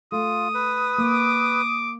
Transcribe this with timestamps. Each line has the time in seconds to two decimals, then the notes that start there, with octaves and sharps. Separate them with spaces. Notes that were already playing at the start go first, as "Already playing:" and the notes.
0.12 A3 F4 D#6
0.54 B4
0.98 A#3 D6